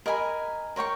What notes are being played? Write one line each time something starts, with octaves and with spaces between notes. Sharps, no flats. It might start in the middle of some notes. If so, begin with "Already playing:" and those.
A#4 D#5 G#5 B5
A#4 C#5 G5 C#6